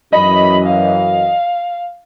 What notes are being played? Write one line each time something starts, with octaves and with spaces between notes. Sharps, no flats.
F#2 E3 D#5 B5
F5